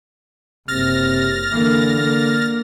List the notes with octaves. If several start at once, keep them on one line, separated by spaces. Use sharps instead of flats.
F#1 C3 F6 A6 A#6
D3 E3 A#3
A#3